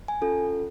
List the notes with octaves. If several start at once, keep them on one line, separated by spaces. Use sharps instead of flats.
G#5
C#4 F4 A4